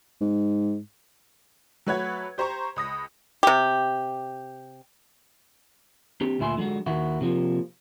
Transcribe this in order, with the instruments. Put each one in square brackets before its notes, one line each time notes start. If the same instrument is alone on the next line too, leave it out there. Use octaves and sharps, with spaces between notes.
[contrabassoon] G#2
[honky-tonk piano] F#3 A3 B4 C#5 F#5 G#6
G4 C5 A#5 C#6
C#2 D#6 A#6
[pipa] C3 G4
[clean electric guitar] C4 D4 G4
D2 A#2 E4 G#5 C6
D3 F#3 G#3 F#4
D#2 D#3 E4 F#4
C3 F3 A#3